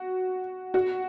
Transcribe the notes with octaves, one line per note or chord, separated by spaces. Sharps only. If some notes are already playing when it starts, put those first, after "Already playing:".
Already playing: F#4
F#4